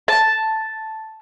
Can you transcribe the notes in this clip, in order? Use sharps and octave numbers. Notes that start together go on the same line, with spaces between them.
A5